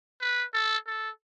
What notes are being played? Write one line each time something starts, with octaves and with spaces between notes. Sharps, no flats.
B4
A4
A4